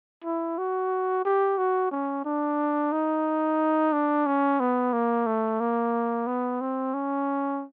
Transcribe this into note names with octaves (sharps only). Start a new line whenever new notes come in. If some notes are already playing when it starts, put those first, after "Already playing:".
E4
F#4
G4
F#4
C#4
D4
D#4
D4
C#4
B3
A#3
A3
A#3
B3
C4
C#4